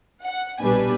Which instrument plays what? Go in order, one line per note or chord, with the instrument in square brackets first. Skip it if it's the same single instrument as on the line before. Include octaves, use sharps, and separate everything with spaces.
[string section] F#5
A#1 B2 G3 D4 B4 G#5